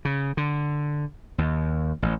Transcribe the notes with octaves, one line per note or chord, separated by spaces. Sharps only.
C#3
D3
D#2
A1